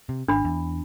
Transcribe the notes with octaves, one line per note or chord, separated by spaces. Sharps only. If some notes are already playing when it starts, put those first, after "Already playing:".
C3
G#1 D4 B5
E2